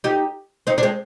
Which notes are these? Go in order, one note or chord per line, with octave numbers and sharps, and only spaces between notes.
D#4 G4
C4 D#4
D4
G#3 C4